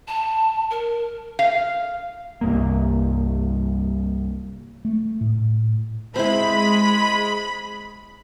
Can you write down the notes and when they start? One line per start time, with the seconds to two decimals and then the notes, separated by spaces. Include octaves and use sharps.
0.08 A5
0.70 A#4
1.39 F5
2.41 C2 G2 A#3
4.85 A3
5.21 A2
6.16 G#3 C4 E4 B5